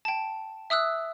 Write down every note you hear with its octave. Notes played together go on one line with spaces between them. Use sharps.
G5 A5
E5 D#6 E6 F#6